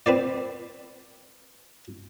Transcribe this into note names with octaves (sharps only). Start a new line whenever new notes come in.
C4 B4 C5 D5